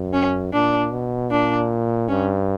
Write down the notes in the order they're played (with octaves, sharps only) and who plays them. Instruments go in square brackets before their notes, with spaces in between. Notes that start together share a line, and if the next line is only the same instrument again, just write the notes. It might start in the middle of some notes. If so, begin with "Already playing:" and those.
Already playing: [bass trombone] F#2
[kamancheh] C#4
[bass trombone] A#2 [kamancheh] D4
[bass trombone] B2
[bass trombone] A#2 [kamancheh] D4
[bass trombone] G2 [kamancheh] C#4